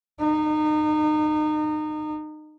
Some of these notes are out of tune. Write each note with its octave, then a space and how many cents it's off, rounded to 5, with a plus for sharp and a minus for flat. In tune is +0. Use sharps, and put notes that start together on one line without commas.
D#4 -30